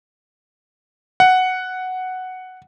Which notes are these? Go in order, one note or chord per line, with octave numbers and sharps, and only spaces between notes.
F#5